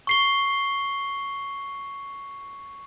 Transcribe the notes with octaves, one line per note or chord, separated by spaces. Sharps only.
C#6 C7 G7